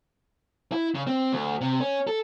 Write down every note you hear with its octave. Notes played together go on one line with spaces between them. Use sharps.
E4
C#3
C4
D2
C3
C#4
A4